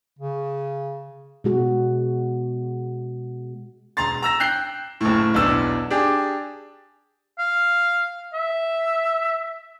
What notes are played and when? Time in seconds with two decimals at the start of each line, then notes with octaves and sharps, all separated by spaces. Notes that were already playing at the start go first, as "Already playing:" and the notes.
0.19 C#3
1.44 B2 G#3 F#4
3.97 E1 A#5 C6 A6
4.22 A#5 E6 A#6
4.40 G5 F#6 G6 C7
5.01 F#1 A2
5.34 B1 E2 D4 E6
5.91 D4 G4 G#4
7.39 F5
8.33 E5